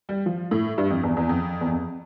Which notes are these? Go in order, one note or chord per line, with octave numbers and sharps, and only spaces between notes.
G3
F3
A2
G2
F2
E2
E2
F2
E2
F2